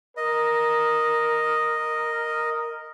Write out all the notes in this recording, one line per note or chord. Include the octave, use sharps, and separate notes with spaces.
A#4 D#5